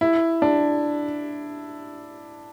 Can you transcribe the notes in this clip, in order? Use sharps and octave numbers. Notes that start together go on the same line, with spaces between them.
E4
D4